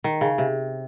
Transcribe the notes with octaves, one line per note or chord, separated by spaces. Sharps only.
D#3
C#3
C3